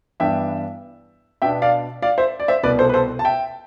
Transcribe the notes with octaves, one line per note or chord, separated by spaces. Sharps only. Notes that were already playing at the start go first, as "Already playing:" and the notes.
G2 E3 B3 D4 E5 G5
B2 B3 D4 E5 G5
D5 F5
D5 F5
C5 E5
D5
C5 E5
C2 B2 B3 B4 D5
A4 C5
B4
A4 C5
A5
E5 G5